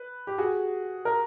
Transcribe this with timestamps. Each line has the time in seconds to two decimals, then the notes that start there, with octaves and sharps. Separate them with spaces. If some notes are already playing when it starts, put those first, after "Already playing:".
Already playing: B4
0.27 G4
0.38 F#4 G#4
1.05 A#4